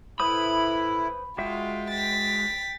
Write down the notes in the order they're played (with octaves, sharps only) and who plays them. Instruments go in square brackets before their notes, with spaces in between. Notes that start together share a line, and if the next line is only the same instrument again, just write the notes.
[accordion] A2 E4 [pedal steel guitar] B4 C5 D#6 [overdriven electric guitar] B5
[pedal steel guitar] G#3 F#4 E5 [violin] F4 [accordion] G5
[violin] A6 B6